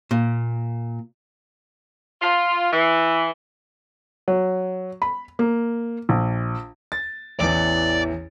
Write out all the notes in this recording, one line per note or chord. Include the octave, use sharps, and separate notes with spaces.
A#2
F4
E3
F#3
B5
A#3
A#1
A6
A1 E2 E3 D5